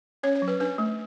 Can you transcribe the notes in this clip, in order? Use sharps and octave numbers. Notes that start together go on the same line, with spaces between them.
C#4 C#5
C#5
F#3
B4
D4 B4
A3